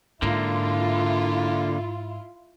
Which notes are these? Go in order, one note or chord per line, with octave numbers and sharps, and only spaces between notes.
G#2 D3 A#3 E4 F4